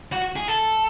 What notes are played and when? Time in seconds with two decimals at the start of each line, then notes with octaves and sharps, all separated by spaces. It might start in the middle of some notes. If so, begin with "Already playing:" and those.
0.12 F#4
0.36 G#4
0.48 A4